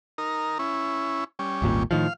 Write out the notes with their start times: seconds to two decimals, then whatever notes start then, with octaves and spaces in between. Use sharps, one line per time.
0.18 D#4 A#4
0.59 C#4 E4
1.39 G3 C#4
1.62 D#1 G#1 A#2
1.91 A2 D#3 F3 F5